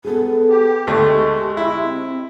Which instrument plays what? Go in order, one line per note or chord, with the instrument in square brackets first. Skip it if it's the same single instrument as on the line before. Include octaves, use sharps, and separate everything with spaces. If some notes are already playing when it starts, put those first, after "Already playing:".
[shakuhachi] B3 [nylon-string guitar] G#4 A4
[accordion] G4
[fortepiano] D2 A3 [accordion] G#3 [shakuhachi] G4 [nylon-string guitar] D5 D#5 G5
[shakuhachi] G4
[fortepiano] E4 [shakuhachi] G4
[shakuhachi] C4